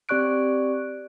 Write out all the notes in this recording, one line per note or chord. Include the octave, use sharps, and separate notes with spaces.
C4 G4 D5 C#6 F#6 D7